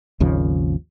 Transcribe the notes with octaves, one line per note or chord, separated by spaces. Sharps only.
G#1 D#2 C#3 F3